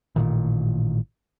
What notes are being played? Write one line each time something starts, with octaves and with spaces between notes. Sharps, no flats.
A1 A#2 D#3